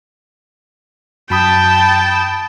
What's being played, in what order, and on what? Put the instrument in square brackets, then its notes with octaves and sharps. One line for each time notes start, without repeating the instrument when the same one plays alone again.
[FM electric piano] F#2 B5 D#6 [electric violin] G5 A5